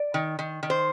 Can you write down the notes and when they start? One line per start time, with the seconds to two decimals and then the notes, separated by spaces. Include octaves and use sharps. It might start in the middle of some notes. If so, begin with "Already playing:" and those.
Already playing: D5
0.14 D#3
0.39 D#3
0.63 D#3
0.70 C5